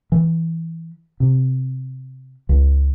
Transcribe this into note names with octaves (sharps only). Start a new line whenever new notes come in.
E3
C3
C#2